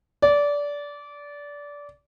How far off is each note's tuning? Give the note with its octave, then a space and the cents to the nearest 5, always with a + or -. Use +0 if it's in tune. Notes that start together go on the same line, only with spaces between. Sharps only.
D5 -20